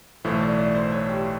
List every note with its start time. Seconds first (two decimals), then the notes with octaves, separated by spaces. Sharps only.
0.24 B1 A2 E3 A3 C5
0.41 D5
0.59 D5
0.75 C5
0.92 C#5
1.09 G4